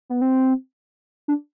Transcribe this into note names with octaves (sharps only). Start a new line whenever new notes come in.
B3
C4
D4